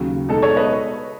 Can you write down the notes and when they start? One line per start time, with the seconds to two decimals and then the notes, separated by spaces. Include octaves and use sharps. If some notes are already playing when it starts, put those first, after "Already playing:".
Already playing: D#2 C#3 F#3
0.29 B2 G#3 D#4 A4
0.42 A4 C#5
0.57 B4 D#5